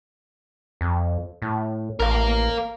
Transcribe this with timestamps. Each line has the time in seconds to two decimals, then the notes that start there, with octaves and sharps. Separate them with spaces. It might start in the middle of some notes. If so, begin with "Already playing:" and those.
0.81 F2
1.42 A2
2.00 A1 A#4 F5